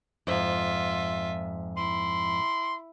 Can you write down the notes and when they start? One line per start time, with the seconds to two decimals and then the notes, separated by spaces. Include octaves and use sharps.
0.27 F2 G#2 F4 E5
1.77 E4 C6